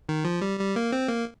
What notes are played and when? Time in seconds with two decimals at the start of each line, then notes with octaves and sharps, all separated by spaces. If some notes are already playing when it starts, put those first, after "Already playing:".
0.09 D#3
0.25 F3
0.41 G3
0.59 G3
0.76 A#3
0.92 C4
1.09 A#3